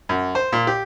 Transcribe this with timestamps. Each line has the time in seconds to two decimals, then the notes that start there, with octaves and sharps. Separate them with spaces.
0.09 F#2
0.35 C5
0.52 A#2
0.67 G4